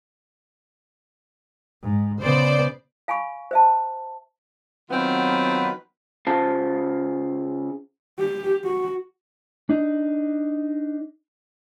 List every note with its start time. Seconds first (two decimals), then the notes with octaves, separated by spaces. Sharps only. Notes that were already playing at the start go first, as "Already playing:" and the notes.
1.83 G#2
2.22 C#3 B3 C5 D5
3.08 F5 G#5 B5 C#6
3.51 C5 E5 A5
4.91 D#3 F#3 B3 C4 F4 B4
6.27 C#3 F4 C5 F5 A5
8.19 G4
8.64 F#4
9.70 D4 D#4